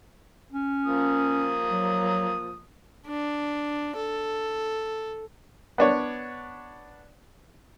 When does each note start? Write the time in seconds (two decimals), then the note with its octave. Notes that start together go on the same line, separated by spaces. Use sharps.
0.53 C#4
0.85 F3 A#3 D#6
1.69 F#3
3.06 D4
3.96 A4
5.78 B3 D4 C#5